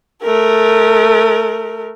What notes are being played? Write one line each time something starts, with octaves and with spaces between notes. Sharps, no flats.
A3 A#4